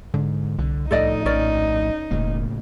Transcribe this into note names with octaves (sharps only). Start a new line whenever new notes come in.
G#2 D3
C2 D3
D2 A2 F3 D#4 A4 D5 D#5
A#1 C#4 A#4 D5
E1 A2 C#3 A#3